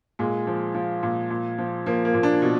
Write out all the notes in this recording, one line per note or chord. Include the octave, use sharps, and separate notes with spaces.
A#2 G#3
F3
F3
A#2
A#2
F3
F3 A#3
A#3
A#2
D4
B2